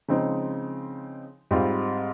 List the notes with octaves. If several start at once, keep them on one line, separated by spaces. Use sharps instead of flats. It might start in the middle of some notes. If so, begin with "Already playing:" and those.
C#3 F3 G#3 C4 D#4
G#2 G3 C4 F4